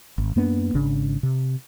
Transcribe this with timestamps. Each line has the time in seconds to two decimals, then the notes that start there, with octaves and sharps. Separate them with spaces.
0.18 G#1
0.36 F#2 A#3 B3 D4
0.74 G#1 C#3 D4
1.23 C3